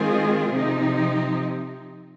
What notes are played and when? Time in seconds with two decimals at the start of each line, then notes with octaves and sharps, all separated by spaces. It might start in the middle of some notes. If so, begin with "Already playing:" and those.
Already playing: D#3 G#3 C4 F4 G#4
0.51 C3 F3 C4 D#4